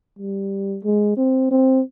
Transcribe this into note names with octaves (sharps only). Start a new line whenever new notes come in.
G3
G#3
C4
C4